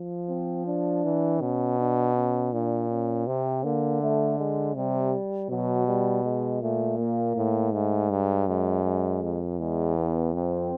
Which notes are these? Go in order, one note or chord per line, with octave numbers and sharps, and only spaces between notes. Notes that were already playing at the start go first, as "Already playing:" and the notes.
Already playing: F3
C4
D4
E3
B2 C#4
D4
C#4
A#2 D4
C#4
C3 C4
D3 A#3
A3
G#3
C3 G3
B2 F#3
G3
G#3
A#2 A3
A#3
A2
G#2 A3
G2 G#3
F#2 G#3
G#3
F2
E2 G#3
B3
F2 C4